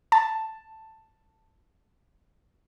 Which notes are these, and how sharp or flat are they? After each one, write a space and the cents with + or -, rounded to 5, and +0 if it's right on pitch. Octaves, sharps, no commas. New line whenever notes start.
A5 +10